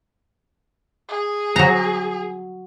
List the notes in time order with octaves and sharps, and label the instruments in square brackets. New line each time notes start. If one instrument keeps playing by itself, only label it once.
[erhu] G#4
[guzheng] F#3 A#5